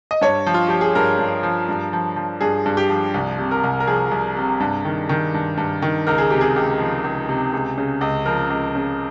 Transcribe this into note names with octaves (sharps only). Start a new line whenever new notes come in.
D#5
G2 C#5
F3
F4
F3 G4
G#4
G2 A#4
G2
F3
G2
F3
F3
G2 G#4
G2
G4
F3
C2
C3
A#4
C2
A#4
F3 G#4
C2
C3
G2
D#3
D#3
G2
G2
D#3
C#2 A#4
G#4
C3 G4
G#4
C#2
F3
C#2
C3
C#2
C#3
C#2
F3 A#4
C#2
C#3